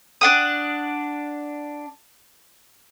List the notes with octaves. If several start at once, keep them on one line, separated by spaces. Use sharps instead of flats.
D4 F#5 D#6